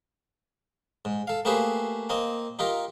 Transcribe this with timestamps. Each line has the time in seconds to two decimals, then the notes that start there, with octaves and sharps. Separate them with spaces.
1.05 G#2
1.27 A4 F5
1.45 A3 A#3 G4 G#4 B4 C5
2.09 A#3 C4 D#5
2.59 D#4 F4 G4 A#4